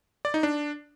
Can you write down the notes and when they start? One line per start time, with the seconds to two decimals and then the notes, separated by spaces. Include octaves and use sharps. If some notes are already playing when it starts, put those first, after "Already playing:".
0.25 D5
0.34 D#4
0.43 D4